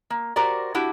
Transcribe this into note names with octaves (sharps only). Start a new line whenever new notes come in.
A#3
F#4 G4 A#4 C5 D5
D4 E4 F#4 G4